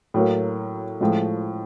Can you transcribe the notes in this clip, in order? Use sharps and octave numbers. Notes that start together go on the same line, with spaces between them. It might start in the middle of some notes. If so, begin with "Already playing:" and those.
A2 F#3 A#3
A2 F3 G#3